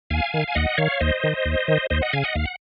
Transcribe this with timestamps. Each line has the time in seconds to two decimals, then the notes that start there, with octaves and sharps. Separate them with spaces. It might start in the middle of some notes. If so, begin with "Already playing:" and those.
0.10 D#2 F5 G#5
0.34 D#3
0.48 G#5
0.55 D#2 D#5 F#5
0.78 D#3 C#5 F5
1.00 D#2 C5 D#5
1.24 D#3
1.46 D#2
1.68 D#3
1.90 D#2 C5 D#5
2.02 D#5 F#5
2.13 C#3 F5 G#5
2.24 D#5 F#5
2.35 D#2 F5
2.46 F#5